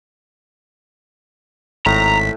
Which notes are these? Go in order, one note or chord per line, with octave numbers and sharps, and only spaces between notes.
G#1 A2 A#5 B6